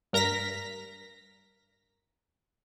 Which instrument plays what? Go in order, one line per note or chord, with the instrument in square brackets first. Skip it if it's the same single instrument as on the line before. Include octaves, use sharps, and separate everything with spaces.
[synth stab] G2 A#4 A#5 A#6 B6